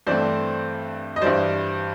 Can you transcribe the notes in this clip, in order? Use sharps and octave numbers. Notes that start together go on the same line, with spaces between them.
G2 E3 A3 C4 C5 D5
D#5
G2 E3 G3 C5 D5